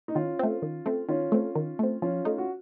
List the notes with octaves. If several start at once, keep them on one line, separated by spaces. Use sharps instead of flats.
D#4
D#3 C#4 F4
A3 C4
D#3
A3 C4
D#3 C#4 F4
A3 C4
D#3
A3 C4
F3 C#4 F4
A3 D#4
F#4